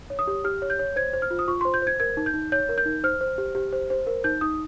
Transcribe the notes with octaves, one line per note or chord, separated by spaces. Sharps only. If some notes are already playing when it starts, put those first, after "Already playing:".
C#5
D#6
G4
G4 F6
C#5
G6
C#5
C5 G#6
C5
F6
F4
D#6
F4 C#6
C5 C6
G6
C5 G#6
A#4 G#6
D#4
G6
D#4
C#5 G6
A#4
G6
D#4
C5 F6
C5
G4
G4
C5
C5
A#4
D#4 G6
D#4 D#6